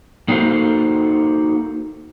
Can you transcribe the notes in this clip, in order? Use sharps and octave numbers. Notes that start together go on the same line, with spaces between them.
A#3 D#4 F#4 A4 C5 F5